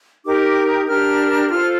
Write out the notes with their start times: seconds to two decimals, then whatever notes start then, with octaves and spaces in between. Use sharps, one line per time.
0.24 D#4 G4 A#4 D6
0.46 D6
0.66 D#6
0.87 D4 G4 A#4 F6
1.49 F4 A4 C5 F6